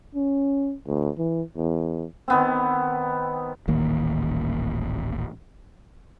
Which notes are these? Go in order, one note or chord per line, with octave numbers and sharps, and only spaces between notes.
C#4
D2
E3
E2
D#3 B3 C4
D#1 A1 D#3 A#3